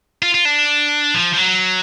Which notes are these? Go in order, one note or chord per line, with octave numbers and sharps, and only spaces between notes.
F4
F4
D4
F3
F3
F#3